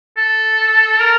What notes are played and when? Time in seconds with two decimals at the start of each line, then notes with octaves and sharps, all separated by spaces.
0.17 A4
1.00 A#4